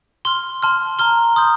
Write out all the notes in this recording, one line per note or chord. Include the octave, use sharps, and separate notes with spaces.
C6 F6 G7
A5 C6 F6
A#5 F6 G7
C6 D#6 G6